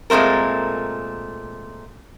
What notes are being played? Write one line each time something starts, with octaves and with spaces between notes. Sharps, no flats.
A#2 G#3 A3 C4 A#4